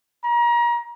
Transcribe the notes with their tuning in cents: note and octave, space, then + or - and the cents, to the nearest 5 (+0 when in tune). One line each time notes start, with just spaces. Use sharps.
A#5 +30